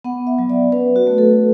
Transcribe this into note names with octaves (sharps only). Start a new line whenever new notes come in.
B3 F#5
E5
F#3
D5
C#4 B4
F#4
A3
A4